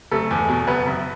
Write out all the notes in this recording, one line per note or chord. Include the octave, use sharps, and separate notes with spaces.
F#1 A3 A4
E2
B2
F#1 B3 B4
F#1